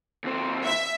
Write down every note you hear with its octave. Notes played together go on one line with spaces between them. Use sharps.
D#2 C4
E5